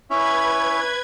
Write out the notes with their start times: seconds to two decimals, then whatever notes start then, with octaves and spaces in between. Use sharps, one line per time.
0.10 C#4 E4 B4 G#6